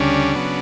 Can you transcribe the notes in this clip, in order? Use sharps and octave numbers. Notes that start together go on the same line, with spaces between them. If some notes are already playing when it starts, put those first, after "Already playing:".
Already playing: D2 C#3 G3 C#4 D4
C#3 F#3 B3